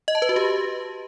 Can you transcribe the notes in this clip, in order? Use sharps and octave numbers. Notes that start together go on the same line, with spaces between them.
D#5
A5
B4
F#4
G4